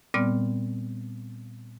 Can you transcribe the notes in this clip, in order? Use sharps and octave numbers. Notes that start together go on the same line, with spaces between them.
A#2 G3 B3 C4 D5 F6